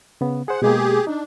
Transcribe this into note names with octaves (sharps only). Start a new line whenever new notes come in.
C#3 B3
G#4 C5 F#5
B2 G#3 A#3 G4 G#4
D4 D#4